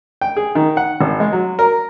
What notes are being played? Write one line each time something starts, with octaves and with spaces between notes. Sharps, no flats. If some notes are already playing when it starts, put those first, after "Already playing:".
G5
G#4
D#3
F#5
G#1
G#3
F#3
A#4